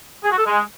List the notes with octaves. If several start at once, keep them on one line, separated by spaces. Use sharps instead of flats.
G#4
F#4
A4
G#3